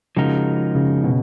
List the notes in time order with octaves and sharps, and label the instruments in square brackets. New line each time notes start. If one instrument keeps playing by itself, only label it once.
[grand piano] C#3 [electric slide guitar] F3 G#3 D#4 F#4 A#4
[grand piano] C#3
B2